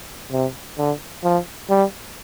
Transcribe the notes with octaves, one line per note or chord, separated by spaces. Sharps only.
C3
D3
F3
G3